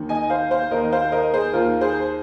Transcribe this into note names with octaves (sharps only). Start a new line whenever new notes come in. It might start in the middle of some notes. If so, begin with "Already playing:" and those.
Already playing: D#2 D#3
D#5 G#5
C5 F5
C5 F5
D#2 D#3 A#4 D#5
C5 F5
A#4 D#5
G#4 C5
D#2 D#3 F4 A#4
G#4 C5